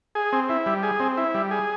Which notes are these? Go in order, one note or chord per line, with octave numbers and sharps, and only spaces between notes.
G#4
C4
E4
G3
G#4
C4
E4
G3
G#4